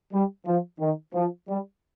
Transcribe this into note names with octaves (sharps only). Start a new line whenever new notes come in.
G3
F3
D#3
F3
G3